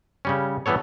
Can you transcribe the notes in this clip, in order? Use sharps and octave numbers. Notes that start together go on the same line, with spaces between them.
C#3 G3 C#4
E3 G3 B3 A4 C#5